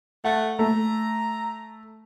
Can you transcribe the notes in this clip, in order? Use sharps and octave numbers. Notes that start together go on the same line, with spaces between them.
A3 F#5
A3 A#5